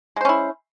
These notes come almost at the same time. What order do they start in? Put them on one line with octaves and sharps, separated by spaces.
G#3 C5 C#4 E4